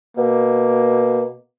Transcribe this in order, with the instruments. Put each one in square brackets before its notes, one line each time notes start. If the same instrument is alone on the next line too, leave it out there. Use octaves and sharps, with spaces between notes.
[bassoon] B2 [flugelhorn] A#3